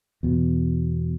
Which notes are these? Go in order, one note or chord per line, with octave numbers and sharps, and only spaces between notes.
E2 B2